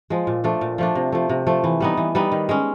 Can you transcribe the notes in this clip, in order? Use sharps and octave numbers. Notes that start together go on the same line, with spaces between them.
F3 G#3
A#2
F3 A3 D4
A#2
F3 A3 D4
C3
F3 A3
C3
F3 A3
E3
G3 B3 D#4
E3
G3 B3 D#4
D#3
G#3 C#4